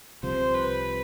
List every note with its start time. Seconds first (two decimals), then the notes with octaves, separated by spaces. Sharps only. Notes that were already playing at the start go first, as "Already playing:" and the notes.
0.23 C2 C3 F3 C5
0.54 B4